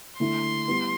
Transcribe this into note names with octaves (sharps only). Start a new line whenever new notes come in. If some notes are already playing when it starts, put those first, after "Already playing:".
D3 A3 E4 C6
G3 B3 E4